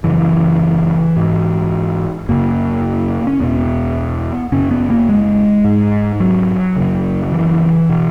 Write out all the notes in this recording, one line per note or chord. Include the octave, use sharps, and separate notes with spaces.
F#2 C#3 E3
G#2
F#2 C#3 A#3
C#4
E2 B2 B3
F#2 C#3 C#4
B3
A#3
G#3
G#2
F#3
F#2 C#3
E3
B2